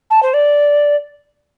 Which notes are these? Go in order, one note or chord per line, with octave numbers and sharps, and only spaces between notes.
A5
C5
D5